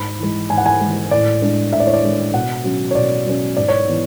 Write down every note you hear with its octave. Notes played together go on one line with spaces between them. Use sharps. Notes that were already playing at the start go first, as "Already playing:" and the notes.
Already playing: G#2 B5
E3 G#3
G#2 G#5
F#5
G#5
E3 G#3
A2 D5
G#3 D4
A2 E5
D5
C#5
D5
G#3 D4
B2 F#5
F#3 C#4
C#5
B2 D5
F#3 C#4
G#2 D5
C#5
E3 B3